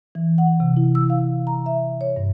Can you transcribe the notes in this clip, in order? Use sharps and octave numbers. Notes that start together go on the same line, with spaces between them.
E3
F#5
C3
E4
E6
F5
A#5
E5
C#5
G2